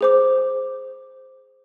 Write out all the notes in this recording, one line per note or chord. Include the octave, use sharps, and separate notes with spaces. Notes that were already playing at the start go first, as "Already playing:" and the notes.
G#4 C5 D6